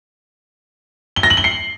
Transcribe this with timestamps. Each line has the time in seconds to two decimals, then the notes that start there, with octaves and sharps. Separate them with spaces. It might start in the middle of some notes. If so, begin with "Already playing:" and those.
1.16 G7
1.23 A#6
1.30 F#7
1.37 G7
1.44 C7